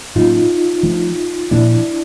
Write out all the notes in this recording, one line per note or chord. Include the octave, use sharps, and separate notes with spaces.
A2 F#3 A#3 C#4 D#4 F4
F3 A3 D4
A#2 F3 A#3 D4 E4